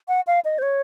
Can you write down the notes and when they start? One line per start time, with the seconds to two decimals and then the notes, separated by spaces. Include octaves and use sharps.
0.08 F#5
0.27 F5
0.45 D#5
0.58 C5
0.62 C#5